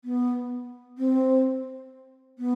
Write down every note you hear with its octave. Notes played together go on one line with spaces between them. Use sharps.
B3
C4
B3